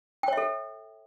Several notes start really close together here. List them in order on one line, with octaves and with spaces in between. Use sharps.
G5 C#5 E5 A4